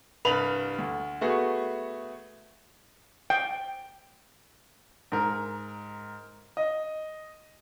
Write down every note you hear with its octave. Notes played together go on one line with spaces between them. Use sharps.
C2 G2 B4 F7 F#7
D2
A3 B3 F#4 G#4
G5
G#2 A#4
D#5